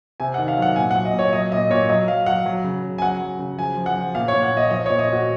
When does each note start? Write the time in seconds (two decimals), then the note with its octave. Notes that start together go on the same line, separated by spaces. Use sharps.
0.20 C3 G#5
0.34 F#5
0.38 D#3
0.48 F5
0.57 F#3
0.62 F#5
0.76 A#2 G#5
0.91 F#5
0.95 F#3
1.05 D#5
1.13 A#2
1.19 C#5
1.33 F#3 D#5
1.52 A#2 D#5
1.70 A#2 C#5
1.89 F#3 D#5
2.08 F#3 F5
2.26 F#3 F#5
2.46 F#3
2.64 C#3
2.83 C#3
2.98 G#5
3.02 F#3 F#5
3.21 F#3
3.39 C#3
3.58 F3 G#5
3.76 F3
3.86 F#5
3.96 F3
4.15 A#2 F5
4.28 C#5
4.34 A#2
4.43 F#5
4.52 A#2
4.57 D#5
4.71 F3 D#5
4.86 C#5
4.90 A#2
4.99 D#5
5.08 A#2 F#4